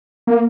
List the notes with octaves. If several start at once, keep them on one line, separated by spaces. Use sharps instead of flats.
A#3